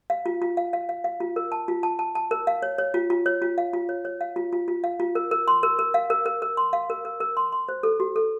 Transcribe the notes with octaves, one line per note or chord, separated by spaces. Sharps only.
F5
F4
F4
F5
F5
F5
F5
F4
A#4
A5
F4
A5
A5
A5
A#4
F5
C#5
C#5
F4
F4
C#5
F4
F5
F4
C#5
C#5
F5
F4
F4
F4
F5
F4
A#4
A#4
C6
A#4
A#4
F5
A#4
A#4
A#4
C6
F5
A#4
A#4
A#4
C6
C6
C5
A4
F#4
A4